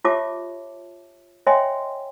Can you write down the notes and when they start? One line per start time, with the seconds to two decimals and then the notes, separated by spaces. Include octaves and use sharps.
0.05 F4 G4 C#5 E5 A5 D6
1.47 C#5 D#5 E5 G5 G#5 C6